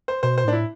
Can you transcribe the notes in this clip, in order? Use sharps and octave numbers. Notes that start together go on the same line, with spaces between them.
C5
B2 C5
C5
A2 D4
E4